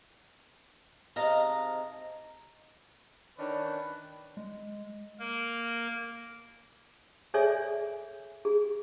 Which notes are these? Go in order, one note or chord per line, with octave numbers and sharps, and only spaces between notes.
G#2 C3 D#5 F5 A5 A#5
D#3 C#4 D4 B4
G#3
A#3 A#4
G#4 A4 C#5 D5 E5 G#5
G#4